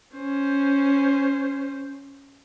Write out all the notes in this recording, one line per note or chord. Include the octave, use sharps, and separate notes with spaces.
C#4 C5